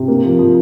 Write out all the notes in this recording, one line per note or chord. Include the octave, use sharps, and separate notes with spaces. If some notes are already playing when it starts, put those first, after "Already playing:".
Already playing: C3
A#3
F3
F3